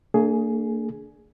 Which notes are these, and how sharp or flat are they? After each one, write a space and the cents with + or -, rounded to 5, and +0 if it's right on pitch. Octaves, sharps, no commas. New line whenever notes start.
A#3 -45 D4 +0 G#4 +10